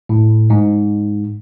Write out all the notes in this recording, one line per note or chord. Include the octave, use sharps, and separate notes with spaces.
A2
G#2